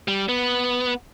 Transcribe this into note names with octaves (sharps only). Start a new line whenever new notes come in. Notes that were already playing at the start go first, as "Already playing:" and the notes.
G3
B3